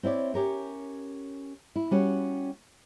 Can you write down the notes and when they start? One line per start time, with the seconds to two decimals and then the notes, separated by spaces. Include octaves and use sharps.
0.03 C4 E4 C#5 D5
0.34 C#4 G4 A#4 C#5
1.76 E4
1.91 G3 C#4 F#4